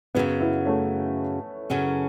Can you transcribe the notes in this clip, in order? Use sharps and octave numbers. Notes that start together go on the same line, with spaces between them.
F#2 C#3 F#3 B3
B3 E4
A3 C#4
F#2 C#3 F#3 C#4